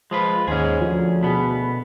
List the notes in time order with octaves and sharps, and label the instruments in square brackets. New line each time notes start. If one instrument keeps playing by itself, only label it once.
[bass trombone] F3 [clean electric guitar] G#3 F4 B4
[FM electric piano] D#2 [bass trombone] G#2 [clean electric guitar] C#4 G#4
[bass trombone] D2 [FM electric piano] F3
[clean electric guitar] B2 B3 [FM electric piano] G#4 B5